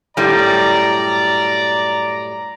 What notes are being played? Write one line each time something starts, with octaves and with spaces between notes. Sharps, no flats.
F#2 A2 G3 D5 A#5